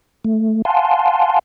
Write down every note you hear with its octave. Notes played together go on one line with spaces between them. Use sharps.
A3
F5 F#5 G#5 A5 C6